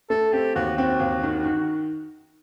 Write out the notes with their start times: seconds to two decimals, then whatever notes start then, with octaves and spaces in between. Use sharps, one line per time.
0.10 A3 A4
0.33 C4 G4
0.55 D#2 F#4
0.78 C4 F#4
1.00 D#2
1.23 D#3
1.45 D#3